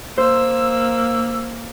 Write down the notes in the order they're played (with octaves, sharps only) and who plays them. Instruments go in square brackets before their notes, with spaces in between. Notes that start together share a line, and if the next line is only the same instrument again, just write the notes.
[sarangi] A#3 [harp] C5 [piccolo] E6